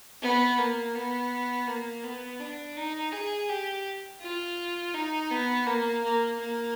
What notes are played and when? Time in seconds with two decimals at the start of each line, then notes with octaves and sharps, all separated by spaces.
0.22 B3
0.58 A#3
0.95 B3
1.67 A#3
2.03 B3
2.40 D4
2.77 D#4
3.12 G#4
3.49 G4
4.21 F4
4.94 D#4
5.31 B3
5.66 A#3
6.03 A#3
6.40 A#3